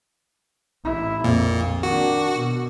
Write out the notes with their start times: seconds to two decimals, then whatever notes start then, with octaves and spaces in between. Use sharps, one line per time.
0.84 A1 E4
1.24 A#1 F2 A#2
1.83 D#3 D4 F#4
2.35 B2